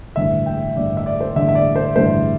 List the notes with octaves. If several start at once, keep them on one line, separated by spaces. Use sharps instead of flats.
A1 G2 D3 E5
G5
A1 G2 D3 D5
E5
D5
C5
A1 G2 D3 E5
E5
D5
C5
A1 G2 D3 C5